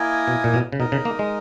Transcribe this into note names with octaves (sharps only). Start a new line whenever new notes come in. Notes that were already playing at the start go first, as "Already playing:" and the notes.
Already playing: A#3 E4 A#4 D#5 G#5
B2
A#2
B2
C#3
B2 D#4 A#4 D#5
C#3
A#3
G#3